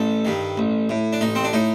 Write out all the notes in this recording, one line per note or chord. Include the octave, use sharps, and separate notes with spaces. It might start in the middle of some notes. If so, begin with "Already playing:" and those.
Already playing: A1 A4
G2 D#3
A1
A2
D4
A1 D#4
C4
D4
A2 D#4